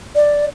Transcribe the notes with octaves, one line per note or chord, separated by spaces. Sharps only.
D5